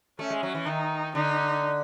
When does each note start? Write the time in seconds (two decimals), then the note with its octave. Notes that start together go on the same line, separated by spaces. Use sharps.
0.19 A3 C#4
0.30 G#3
0.43 F#3
0.55 E3
0.66 D#3 D#4
1.15 D3 D#4